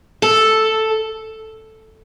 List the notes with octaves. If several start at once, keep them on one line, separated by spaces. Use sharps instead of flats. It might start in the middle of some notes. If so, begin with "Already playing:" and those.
A4